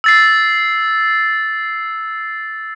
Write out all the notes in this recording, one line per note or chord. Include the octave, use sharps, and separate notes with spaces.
E6 A6 C7